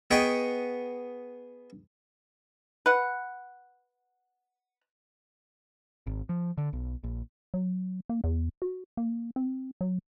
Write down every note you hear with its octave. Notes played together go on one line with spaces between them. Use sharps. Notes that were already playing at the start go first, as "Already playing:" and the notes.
B3 G#4 D#5 G5 C#6
B4 F#5
G#1
F3
D3
B1
A#1
F#3
A#3
E2
F#4
A#3
C4
F#3